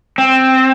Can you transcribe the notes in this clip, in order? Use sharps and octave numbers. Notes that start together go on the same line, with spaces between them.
C4